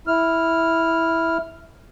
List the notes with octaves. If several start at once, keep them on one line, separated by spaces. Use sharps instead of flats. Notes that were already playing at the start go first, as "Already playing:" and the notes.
E4 F6